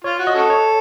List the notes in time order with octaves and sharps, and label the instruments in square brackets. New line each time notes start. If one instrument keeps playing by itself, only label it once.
[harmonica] F4 [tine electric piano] C#5
[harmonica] F#4
[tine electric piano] D#5
[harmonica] C#4 F#4 A4
[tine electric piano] C#5